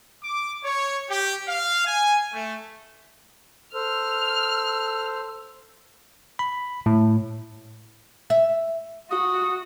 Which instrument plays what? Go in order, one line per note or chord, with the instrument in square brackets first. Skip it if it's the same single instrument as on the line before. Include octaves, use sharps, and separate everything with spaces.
[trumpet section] D6
C#5
G4
F5
G#5
A3
[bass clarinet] A4 [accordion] C5 [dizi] E6 [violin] F6
[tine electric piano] B5
A2
[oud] E5
[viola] F#4 [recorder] D#6